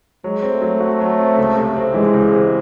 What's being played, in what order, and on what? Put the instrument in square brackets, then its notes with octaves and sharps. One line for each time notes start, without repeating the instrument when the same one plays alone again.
[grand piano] F#3 [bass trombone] G#3
[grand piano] C4
[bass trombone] A3
[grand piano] F#3
F#4
F#3
C4
C#2
C3
C4
[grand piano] E3 [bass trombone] G#3
[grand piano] C#2
C3